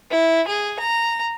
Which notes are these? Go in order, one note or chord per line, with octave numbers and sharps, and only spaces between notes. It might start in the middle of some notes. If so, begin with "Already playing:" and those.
E4
G#4
A#5